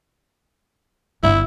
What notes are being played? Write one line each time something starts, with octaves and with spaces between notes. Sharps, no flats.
G1 E4